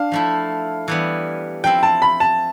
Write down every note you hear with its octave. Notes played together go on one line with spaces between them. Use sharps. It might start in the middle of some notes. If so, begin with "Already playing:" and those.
Already playing: D4 F5
F3 A3 E4
E3 G3 B3
F3 C4 E4 G5
A5
B5
A5